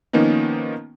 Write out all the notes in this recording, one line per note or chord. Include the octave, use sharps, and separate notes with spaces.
D#3 F3 A#3 B3 C#4 D#4